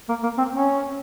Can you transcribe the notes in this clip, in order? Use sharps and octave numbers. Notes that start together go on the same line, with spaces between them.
A#3
A#3
C4
C#4